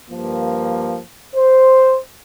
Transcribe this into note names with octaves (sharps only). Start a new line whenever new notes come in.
G2 F3 A#3
C5